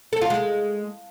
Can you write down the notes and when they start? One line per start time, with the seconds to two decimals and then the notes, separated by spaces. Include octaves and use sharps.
0.13 A4
0.21 F4
0.30 G#3